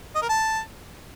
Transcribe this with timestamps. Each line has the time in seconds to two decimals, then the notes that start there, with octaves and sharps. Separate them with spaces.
0.15 D#5
0.22 A#4
0.29 A5